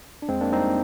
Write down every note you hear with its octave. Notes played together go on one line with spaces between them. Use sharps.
D4
F2 G#3 C4
A#3 D4
G3 C4 D#4